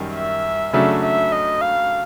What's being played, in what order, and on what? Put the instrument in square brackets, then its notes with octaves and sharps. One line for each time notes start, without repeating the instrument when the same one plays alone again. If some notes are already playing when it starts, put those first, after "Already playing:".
Already playing: [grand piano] F#2 D#3 G3
[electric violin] E5
[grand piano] C#3 F#3 A3 D4 [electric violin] E5
[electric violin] E5
D#5
F5